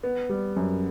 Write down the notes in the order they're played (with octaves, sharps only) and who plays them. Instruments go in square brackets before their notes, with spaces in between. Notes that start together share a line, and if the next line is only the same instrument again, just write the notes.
[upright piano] B3
G3
F#2